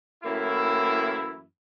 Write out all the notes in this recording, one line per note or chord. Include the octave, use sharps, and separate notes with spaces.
F#2 A2 E3 A#3 E4